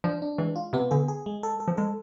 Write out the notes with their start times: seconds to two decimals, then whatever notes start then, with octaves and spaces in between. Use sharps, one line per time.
0.04 F3 D4
0.22 D4
0.38 E3 G#3
0.56 F4
0.73 C3 B3
0.91 D3 G#4
1.08 G#4
1.26 G#3
1.43 A4
1.60 A4
1.68 F3
1.77 G#3 A4